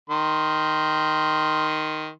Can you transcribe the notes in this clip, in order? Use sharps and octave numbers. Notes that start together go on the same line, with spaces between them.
D#3 C6